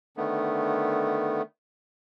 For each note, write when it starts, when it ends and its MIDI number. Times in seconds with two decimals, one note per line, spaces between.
0.17 1.42 50
0.17 1.42 51
0.17 1.42 57
0.17 1.42 59